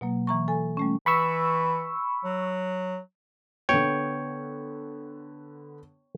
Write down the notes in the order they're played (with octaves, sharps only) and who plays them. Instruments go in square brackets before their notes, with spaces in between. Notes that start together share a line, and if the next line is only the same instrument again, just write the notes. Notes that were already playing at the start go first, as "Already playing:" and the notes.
[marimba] B2 F#3 A#3
E3 A#5 C#6
A4 G#5
G3 A3 C#4
[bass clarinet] E3 [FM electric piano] B5 C#6 E6
[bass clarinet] F#3
[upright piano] D3 B3 [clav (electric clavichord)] C#5 G5